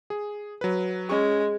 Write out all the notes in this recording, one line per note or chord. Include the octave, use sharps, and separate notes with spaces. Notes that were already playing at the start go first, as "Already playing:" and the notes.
G#4
F#3 B4
G#3 C#4 C#6